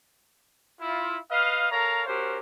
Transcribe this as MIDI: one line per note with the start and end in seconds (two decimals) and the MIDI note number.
0.81 1.18 64
0.81 1.18 65
1.31 1.67 71
1.31 1.67 75
1.31 1.67 77
1.71 2.07 69
1.71 2.07 70
1.71 2.07 73
1.71 2.07 77
1.71 2.07 82
2.07 2.40 61
2.07 2.40 66
2.07 2.40 67
2.07 2.40 70
2.07 2.40 72